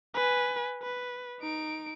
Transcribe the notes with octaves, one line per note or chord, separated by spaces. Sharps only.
B4 G#5
B4
D#4 D7